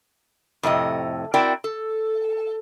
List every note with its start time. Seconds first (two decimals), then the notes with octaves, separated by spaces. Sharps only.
0.63 F2 A2 C3 D#5
1.34 C4 E4 F#4 A#4 D5 G5
1.64 A4